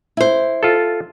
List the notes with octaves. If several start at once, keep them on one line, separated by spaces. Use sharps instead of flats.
E4 C5
F4 A4